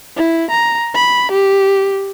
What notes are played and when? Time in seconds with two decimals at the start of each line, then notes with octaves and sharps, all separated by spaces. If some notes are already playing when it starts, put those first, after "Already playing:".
0.17 E4
0.51 A#5
0.95 B5
1.32 G4